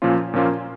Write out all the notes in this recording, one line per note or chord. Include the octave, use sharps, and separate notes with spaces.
A#2 F3 A#3 C#4 F4
A#2 F3 A#3 C#4 F4